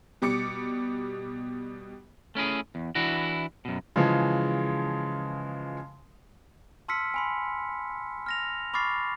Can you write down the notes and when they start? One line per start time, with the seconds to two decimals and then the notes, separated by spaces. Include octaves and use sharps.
0.22 B2 G3 D6 C#7
2.35 A3 C#4 E4 G#4
2.75 E2
2.95 E3 D4 E4 F#4
3.65 F#2 B2
3.96 C#3 E3 F3 G#3
6.88 A5 C6 E6 F6 B6 C#7
7.14 G#5 B5 C6
8.26 F6 A#6 F7
8.74 B5 C#6 D6 F6 A6 C7